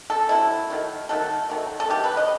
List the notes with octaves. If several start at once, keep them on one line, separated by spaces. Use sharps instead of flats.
A4
C3 F#3 A3 E4
D#3 F#3 A3
D#3 F#3 A3 A4
D#3 F#3 A3
A4
D#3 F#3 A3 G4
B4
D#5